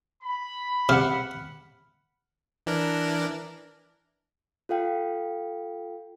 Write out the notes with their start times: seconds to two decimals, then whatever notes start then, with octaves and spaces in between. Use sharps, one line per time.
0.22 B5
0.89 C3 F#5 F6
2.66 E3 D4 A#4
4.69 F4 A4 F5 G5